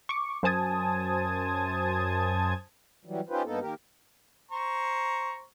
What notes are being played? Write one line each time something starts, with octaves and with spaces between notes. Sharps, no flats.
C#6 D6
F#2 C5 G#5 A5 D#6 G#6
E3 F#3 G3
C#4 D#4 F4 G4 B4 C5
G2 A#3 B3 D#4 A4
D#3 A#3 G4 A#4
C5 A#5 C#6